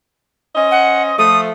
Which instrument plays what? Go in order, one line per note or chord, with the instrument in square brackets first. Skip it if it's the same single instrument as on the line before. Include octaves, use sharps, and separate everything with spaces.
[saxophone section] C#4 C5 D#5
[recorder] F#5
[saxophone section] F3 A3 [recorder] D#6